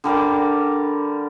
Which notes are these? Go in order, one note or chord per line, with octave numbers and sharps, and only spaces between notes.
D3 G3 A#4 D5